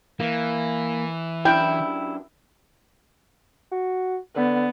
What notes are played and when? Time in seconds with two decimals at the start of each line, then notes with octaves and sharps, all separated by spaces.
0.20 E3 A#3
1.45 F#2 D4 E4 G4 G5
3.71 F#4
4.36 D3 B3